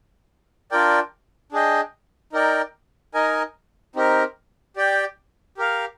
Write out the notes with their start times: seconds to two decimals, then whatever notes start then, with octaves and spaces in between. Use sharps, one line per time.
0.71 D4 F4 A#4 D5 G5
1.52 D4 G#4 D#5 G5
2.33 D#4 A#4 D5 G5
3.14 D#4 A#4 D#5 G#5
3.95 C4 D#4 G4 A#4
4.76 G4 D5 G5
5.57 G4 A#4 F5